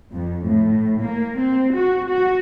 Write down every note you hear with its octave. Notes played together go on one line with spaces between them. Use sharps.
F2
A2
A#3
C4
F#4
F#4